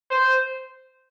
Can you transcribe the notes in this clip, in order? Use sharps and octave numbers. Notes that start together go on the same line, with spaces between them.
C5